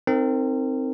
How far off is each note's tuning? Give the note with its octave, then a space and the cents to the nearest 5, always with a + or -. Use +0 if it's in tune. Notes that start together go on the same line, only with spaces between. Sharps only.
C4 +0 D#4 +0 A#4 -30